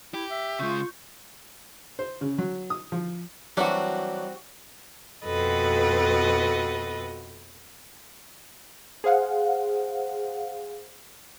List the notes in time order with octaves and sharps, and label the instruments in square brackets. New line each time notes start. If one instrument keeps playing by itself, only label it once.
[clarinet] E4 [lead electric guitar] G4
[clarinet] E5
[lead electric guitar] C#3 G#3 [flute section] F4 C#6 G6
[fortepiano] C5
C#3
F#3
D#6
F3
[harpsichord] E3 F#3 D4 [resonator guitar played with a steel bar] G3 C4 F#4
[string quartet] F2 B2 F#4 A4 B4 D#5
[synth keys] G#4 C5 F5 F#5